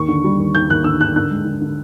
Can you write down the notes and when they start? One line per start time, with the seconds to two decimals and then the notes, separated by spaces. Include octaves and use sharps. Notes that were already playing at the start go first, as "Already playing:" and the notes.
Already playing: D#2 C#6
0.08 D3
0.24 G3
0.39 D#2
0.54 D#2 G6
0.69 D#2 F#6
0.84 D3 E6
1.00 D3 F#6
1.16 D3 F#6
1.31 G#3
1.45 D3
1.61 D3